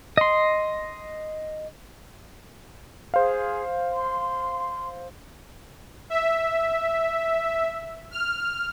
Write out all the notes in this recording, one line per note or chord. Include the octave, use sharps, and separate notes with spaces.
D#5 C6
G#4 C5 F5
C6
E5
F6